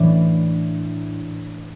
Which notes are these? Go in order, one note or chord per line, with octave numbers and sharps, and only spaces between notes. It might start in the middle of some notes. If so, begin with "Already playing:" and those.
Already playing: A2 E3 D4